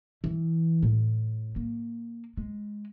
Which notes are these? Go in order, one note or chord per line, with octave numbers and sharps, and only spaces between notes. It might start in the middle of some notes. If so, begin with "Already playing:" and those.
E3
A2
A#3
G#3